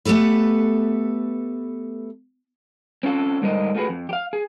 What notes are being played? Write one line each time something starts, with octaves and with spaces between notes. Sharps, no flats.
A3 B3 G4 A4 B4
C4 C#4 F4 A4
G#2 D3 G3 A#4 C5 D#5
A3 F4 F#4 G#4 B4
F2
G4 F5
G#4